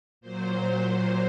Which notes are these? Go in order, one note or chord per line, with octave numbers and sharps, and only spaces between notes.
A#2 F#3 C5